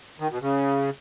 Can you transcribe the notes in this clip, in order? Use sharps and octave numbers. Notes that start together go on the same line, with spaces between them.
D#3
B2
C#3